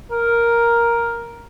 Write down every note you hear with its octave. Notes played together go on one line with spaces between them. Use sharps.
A#4